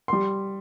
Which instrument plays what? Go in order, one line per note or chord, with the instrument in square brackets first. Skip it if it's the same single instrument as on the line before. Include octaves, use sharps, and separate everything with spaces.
[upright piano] G3 C6